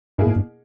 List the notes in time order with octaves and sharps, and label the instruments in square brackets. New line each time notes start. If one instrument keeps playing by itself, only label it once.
[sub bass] G2 [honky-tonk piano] B2 A#3 E4 G#4
[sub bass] G#2
G2